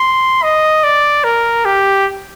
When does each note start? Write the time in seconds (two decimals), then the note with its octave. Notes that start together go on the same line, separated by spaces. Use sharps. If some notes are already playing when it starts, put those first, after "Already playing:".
Already playing: C6
0.43 D#5
0.84 D5
1.24 A#4
1.65 G4